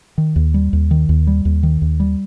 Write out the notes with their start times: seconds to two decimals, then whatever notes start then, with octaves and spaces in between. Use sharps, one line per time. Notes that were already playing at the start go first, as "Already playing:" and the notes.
0.18 D#3
0.36 D#2
0.54 G3
0.73 D#2
0.91 D#3
1.09 D#2
1.27 G3
1.45 D#2
1.63 D#3
1.82 D#2
2.00 G3